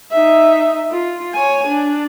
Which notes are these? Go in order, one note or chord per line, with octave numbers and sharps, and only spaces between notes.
D#4 E5
F4
C#5 G#5
D4